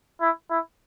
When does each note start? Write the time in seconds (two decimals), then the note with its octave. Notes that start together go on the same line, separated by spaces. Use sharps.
0.21 E4
0.50 E4